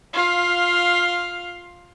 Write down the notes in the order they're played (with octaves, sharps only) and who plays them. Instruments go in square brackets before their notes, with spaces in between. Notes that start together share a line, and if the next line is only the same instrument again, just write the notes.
[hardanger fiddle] F4 F5